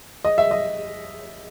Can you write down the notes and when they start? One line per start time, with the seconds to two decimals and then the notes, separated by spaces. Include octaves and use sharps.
0.25 D#5
0.38 E5
0.51 D#5